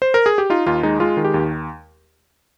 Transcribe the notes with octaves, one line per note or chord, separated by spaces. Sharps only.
C5
A#4
G#4
G4
D#4 F4
D#2 F4
G#3 D#4
G#3 F4
D#3
G4
D#2